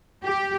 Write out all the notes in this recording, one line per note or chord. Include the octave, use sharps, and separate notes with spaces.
G4